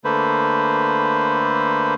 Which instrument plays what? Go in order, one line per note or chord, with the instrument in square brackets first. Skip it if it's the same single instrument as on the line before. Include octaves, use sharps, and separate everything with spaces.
[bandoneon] D3 A3 A#3 B4 C5